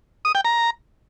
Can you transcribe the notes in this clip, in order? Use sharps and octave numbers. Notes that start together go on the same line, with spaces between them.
D#6
G5
A#5